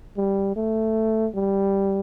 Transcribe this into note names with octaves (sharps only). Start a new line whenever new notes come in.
G3
A3
G3